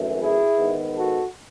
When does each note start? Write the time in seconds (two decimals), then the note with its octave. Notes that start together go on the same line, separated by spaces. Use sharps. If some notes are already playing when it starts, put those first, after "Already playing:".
Already playing: G#1 F#2 E3 A3
0.21 E4 G#4
0.58 G#2 D#3 G#3 B3
0.96 F#4 A4